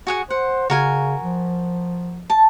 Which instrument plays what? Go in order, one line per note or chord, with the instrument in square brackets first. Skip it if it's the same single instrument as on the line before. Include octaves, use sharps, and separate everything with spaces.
[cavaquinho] F#4 G#4 F#5
[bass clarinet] C5 [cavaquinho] F#5
[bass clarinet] C#3 [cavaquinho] F#4 A#4 G#5
[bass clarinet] F3
[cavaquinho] A5